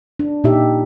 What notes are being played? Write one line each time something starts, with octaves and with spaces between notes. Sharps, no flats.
D4
A#2 D#4 G4 E5